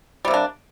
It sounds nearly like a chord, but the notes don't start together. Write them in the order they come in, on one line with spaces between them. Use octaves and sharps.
G3 C3 A#3 D4